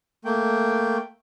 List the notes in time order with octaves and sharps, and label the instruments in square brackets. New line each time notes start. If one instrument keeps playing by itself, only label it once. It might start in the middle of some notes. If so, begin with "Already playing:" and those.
[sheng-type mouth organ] A3 A#3 G5